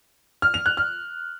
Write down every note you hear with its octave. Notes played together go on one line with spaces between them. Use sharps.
F6
F7
F#6
F6